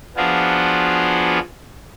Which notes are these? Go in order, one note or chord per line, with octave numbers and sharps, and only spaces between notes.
F3 B3 D4 F4 F#4 G#4